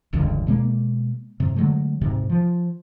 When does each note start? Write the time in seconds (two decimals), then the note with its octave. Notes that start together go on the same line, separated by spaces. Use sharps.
0.13 E1 C#2 G2 D3
0.47 B2 G#3 A#3
1.40 G2 C3
1.56 D3 F#3 G#3 A3
2.01 D1 G#2 C3
2.29 F3